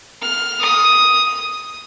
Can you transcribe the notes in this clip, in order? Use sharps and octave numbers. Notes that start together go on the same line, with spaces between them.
F6
D#6